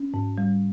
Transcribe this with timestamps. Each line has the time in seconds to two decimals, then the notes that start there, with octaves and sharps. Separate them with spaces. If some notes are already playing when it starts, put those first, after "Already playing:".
Already playing: C#4
0.14 G#2
0.38 G3